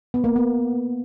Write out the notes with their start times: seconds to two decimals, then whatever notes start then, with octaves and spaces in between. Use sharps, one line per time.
0.14 B3
0.24 A#3
0.36 B3